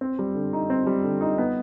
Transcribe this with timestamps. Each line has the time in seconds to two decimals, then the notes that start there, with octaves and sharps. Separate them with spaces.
0.01 C4
0.19 G3
0.35 D3
0.53 D#4
0.70 C4
0.87 G3
1.03 D3
1.21 D#4
1.38 B3